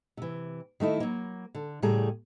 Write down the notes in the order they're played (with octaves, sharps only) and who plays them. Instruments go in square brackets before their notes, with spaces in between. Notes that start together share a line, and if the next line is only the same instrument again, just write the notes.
[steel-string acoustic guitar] C3 E3
D#3 A3 D#4 E4
F#3 A#3
D3
A2 C#3 G3 A3 G#4 A#5